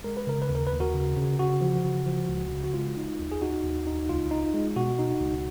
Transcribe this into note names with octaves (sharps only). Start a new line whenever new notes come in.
G#3 A#4
B4
C#3 A#4
B4
D#2
A#4
B4
D#2
F#4 A#4
C#3
C#3
C#3 F#4
F3
C#3
F3
C#2
C#3
F#4
G#3 F4
D#4
D#2
G#4
D#4 F#4
D#2
D#4
C#2 F4
D#4
G#3
B2 F#4
D#4
C#2